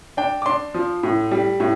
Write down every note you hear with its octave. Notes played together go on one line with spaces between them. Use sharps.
D4 G5
D6
D4 C6
F3
A2
G3
A2